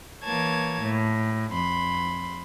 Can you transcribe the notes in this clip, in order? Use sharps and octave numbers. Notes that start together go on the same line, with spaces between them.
E3 A#3 C#5 A5 G#6
A2
F2 B5 C6